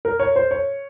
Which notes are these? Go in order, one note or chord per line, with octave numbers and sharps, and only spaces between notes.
A#4
C#5
C5
C#5